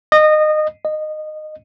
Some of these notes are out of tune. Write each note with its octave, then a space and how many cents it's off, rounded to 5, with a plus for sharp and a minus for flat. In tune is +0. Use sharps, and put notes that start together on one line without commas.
D#5 -20
D#5 -15